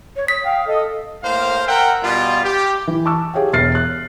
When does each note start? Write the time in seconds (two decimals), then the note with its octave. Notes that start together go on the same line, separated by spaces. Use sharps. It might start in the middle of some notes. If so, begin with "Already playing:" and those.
0.16 C#5
0.28 D#6 B6
0.45 F5 G5
0.67 A4 D#5
1.23 A2 A#3 C5 F5
1.67 A#4 E5 F#5 G5
2.03 B2 G3 F4
2.44 G4
2.87 E3
3.05 A5 C#6 D6 E6
3.34 G4 G#4 C#5 E5 F5 G5
3.53 E1 E5 F6 A6 C7
3.75 F#6